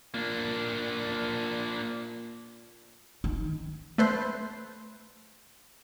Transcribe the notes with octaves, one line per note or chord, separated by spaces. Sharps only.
A#2 A#3 D4
D#3
A3 B4 C5